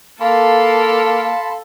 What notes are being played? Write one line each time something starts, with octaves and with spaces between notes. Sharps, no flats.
A#3 A4 F5 A5 B5 C6